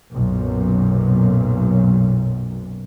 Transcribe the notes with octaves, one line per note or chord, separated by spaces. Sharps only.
B1 F#2 A#2